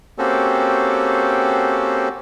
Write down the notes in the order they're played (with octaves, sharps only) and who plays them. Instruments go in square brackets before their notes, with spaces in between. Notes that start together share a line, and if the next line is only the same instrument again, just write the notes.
[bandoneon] A#3 C4 C#4 F#4 G4 A4